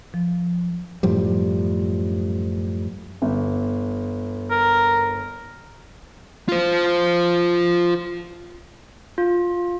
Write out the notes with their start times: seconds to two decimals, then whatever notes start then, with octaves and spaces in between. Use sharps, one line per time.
0.14 F3
1.03 F#2 A2 F3 G3
3.22 G1
4.50 A#4
6.48 F4 C5
9.18 F4